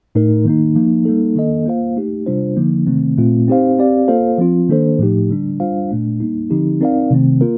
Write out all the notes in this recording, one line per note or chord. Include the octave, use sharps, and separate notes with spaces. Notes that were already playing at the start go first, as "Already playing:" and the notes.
A2 A3 D#4 A#4
D#3 A#3 D#4
F3 A#3 D#4
G3 A#3 D#4 A4
D#3 A#3 D4 A4 D#5
A#3 F4 C5 F5
A3 D#4 G4
C3 G3 D4 F4 C5
D3 F3 A#3 D#4
C3 D#3 A3 C4
A#2 A3 C4 F4
C4 D#4 G4 C5 F5
C4 G4 D5 F5
A#3 F4 A4 C5 F5
F3 C4 F4
D#3 A#3 D4 A4 C5
A2 F3 A3 D#4 G4
D3 G3 D4
G3 D4 F4 C5 F5
A#2 A3 D4
G3 A#3 D#4
D3 F3 C4 D#4 G4
C4 D#4 A#4 D5 F5
C3 D#3 A3 C4
A#3 F4 A#4